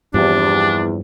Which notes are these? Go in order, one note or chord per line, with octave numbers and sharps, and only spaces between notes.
E2 G2 F3 C4 D4 G4